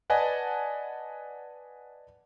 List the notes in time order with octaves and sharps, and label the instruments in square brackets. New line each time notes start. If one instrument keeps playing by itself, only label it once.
[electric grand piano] B4 D5 D#5 F#5 G#5 A5